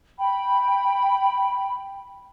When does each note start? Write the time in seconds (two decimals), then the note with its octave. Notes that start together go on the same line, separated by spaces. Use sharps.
0.18 G5 B5